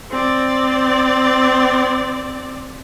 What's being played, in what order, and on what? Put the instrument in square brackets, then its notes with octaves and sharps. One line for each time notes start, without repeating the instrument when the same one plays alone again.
[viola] C4 D5